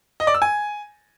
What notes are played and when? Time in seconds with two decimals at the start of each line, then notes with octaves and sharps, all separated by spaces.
0.20 D#5
0.27 D5
0.34 E6
0.42 G#5